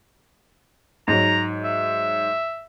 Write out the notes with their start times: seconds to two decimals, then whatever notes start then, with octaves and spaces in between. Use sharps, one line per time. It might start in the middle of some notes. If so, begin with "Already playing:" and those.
1.08 G#2 F#3 A#5
1.64 E5